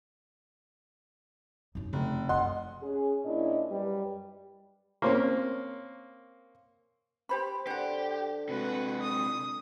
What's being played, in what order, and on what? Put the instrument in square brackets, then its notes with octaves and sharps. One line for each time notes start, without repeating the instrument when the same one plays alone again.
[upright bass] F#2 D#4
[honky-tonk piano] F1 [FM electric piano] C#3
[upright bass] F3 D#4 [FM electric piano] D#5 F#5 [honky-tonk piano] C6
[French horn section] C#4 G#4
A#2 C#4 D4 E4 D#5
F#2 G3 B4
[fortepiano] A#3 C4 C#4
[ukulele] G4 C5 B5
[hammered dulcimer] D3 [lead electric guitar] G4 [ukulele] C5 F#5
[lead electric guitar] C3 G#3 [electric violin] F#4 B4
[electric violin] D#6